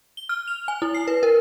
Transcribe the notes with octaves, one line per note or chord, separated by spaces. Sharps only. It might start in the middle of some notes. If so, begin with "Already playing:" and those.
G7
F6
F7
G#5
E4
C7
B4
A#4